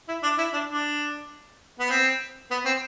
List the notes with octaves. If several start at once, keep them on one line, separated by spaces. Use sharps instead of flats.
E4
D4
E4
D4
D4
B3
C4
B3
C4